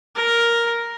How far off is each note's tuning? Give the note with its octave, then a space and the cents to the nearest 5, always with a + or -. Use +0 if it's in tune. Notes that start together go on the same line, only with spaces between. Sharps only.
A#4 +5